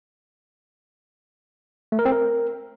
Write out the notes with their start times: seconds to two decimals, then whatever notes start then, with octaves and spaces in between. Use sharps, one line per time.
1.92 A3
1.99 A#4
2.05 C4
2.12 A#4